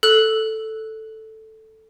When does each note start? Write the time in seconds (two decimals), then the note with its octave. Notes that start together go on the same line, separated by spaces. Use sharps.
0.03 A4 F#6